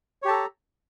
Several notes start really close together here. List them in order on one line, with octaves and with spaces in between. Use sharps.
C#5 G4 A5 A4 A#5